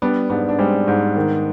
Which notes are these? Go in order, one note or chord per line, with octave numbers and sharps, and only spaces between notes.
G3 B3 D4
G#2 B3 D4
D4
G3 G#3 C4
G#2
D#3